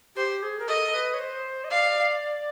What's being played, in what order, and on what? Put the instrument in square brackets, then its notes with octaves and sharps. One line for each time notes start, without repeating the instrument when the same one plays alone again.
[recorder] G4 [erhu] C5
[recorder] G#4
A#4
[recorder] A4 [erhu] D#5
[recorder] B4
C#5
C5
D#5
[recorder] D5 [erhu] F5